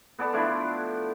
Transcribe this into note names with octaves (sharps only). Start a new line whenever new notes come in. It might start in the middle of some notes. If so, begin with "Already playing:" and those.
B3 A4 D5 A5
F3 A3 D4 E4